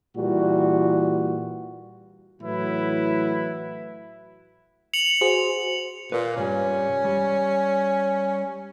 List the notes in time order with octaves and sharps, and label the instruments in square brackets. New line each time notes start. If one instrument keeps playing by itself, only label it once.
[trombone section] A#2 E3 G3 F#4
[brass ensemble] A2 E3 F#3 E4 B4
[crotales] C#7 F7 F#7
[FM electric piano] F#4 G#4 C5
[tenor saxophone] A#2 [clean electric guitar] B4 F5
[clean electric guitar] C2 G2 G3 [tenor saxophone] C#4
[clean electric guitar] G3